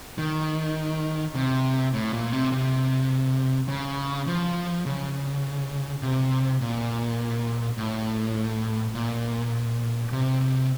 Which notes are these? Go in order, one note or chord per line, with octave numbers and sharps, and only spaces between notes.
D#3
C3
A2
A#2
C3
C3
C#3
F3
C#3
C3
A#2
A2
A#2
C3
C3